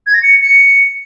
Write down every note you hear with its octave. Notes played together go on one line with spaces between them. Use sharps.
G#6
A#6
C#7
C#7